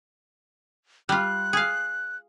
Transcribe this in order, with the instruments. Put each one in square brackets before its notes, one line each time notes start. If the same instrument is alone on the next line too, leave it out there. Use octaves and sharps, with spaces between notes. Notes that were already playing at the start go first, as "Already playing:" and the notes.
[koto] G3 F4 [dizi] F#6
[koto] G#4 F5